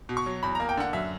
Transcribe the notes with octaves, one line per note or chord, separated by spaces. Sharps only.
B2
C#6
F#3
E2 B5
A#3 A#5
G5
D3 F#5
F#2 E5